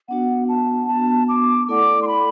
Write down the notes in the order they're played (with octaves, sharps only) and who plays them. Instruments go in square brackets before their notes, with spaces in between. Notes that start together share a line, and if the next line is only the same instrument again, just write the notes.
[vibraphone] B3 D4 F#4 [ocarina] F#5
[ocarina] A5
[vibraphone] B3 D4 F#4 [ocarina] A5
[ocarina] D6
[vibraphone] A3 E4 A4 D5 F#5 [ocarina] D6
[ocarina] C6
B5